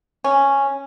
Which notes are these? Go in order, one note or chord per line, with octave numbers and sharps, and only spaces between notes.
C#4